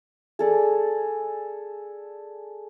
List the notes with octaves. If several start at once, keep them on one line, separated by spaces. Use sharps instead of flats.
G#4 A4 D5